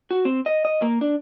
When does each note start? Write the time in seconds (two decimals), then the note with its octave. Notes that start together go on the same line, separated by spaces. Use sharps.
0.11 F#4
0.25 C4
0.46 D#5
0.65 D#5
0.82 A#3
1.01 D4